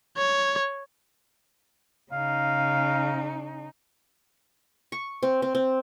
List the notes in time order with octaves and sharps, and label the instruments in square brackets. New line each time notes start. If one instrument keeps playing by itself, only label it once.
[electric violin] C#5
[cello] C#3 D#4 [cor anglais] F5
[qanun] C#6
C4
C4
C4